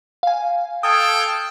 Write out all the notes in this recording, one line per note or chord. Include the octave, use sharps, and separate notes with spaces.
F5 G#5
A4 F5 G5 D#6 G#6